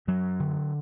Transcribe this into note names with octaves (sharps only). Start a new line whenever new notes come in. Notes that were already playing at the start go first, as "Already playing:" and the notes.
F#2 F#3
D3